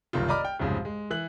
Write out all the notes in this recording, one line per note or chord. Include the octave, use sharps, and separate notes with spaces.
F#1 C2 D#3 F4
D5 D#5 A#5 B5 D6 F6
G5
C2 F2 G#2 C#3
G#3
E3 F#6 F#7